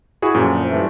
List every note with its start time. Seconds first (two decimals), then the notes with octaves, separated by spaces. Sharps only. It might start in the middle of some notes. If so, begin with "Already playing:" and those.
0.22 E4 F#4 G#4
0.34 F#2 A#2 D3 F3
0.68 G2 E3 A3